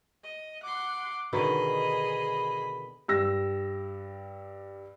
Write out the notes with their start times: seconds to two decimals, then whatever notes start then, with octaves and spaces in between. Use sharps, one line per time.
0.24 D#5
0.63 F#5 C6 D6
1.33 B2 D3 D#3 G#4 D#5 B5
3.08 G2 G3 E6 A#6